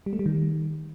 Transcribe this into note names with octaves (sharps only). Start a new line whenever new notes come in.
G3
A3
G3
D#3